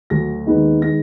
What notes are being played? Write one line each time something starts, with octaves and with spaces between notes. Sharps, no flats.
D2 D3 F#3 A#6
D#2 D#3 G#3 B3 D#4
D#3 G#3 B3 D#4 A#6